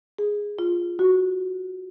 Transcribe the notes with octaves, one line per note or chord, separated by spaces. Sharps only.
G#4
F4
F#4